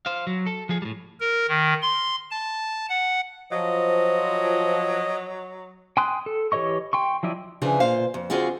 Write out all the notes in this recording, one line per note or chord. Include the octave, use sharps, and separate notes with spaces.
C5 F5
F#3
A4
F3 G#4
A2 G3
A#4
D#3
C6
A5
F#5
F3 F#3 D#5
G5 G#5 C6 D#6 F#6
A4
E3 G4 C#5 D#5 C#6
G5 C6 C#6
F3 F#3 E4 D5 D#5
C#3 E3 F3 D4 G#4
A#2 C5 F5
F2
D3 C4 F4 F#4 G#4